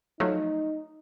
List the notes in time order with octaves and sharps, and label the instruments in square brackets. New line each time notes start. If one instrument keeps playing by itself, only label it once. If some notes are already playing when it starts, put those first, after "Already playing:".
[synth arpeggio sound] F3 F#3 A3 [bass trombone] D#4